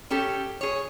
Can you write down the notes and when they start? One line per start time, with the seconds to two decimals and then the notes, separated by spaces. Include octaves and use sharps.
0.10 C#4 G4 A4
0.61 G#4 C#5